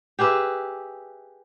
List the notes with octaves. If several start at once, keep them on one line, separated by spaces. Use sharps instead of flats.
G4 G#4 B4 E5